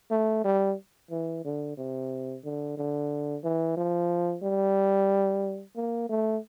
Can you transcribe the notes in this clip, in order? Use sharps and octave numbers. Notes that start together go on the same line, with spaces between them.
A3
G3
E3
D3
C3
D3
D3
E3
F3
G3
A#3
A3